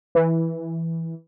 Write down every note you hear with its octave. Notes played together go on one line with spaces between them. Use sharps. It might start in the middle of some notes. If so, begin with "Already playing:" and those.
E3